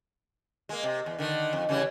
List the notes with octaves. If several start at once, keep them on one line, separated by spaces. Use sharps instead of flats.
G#3 A#3
C3
E2
D3 D#3
F2
C#3 E3 G3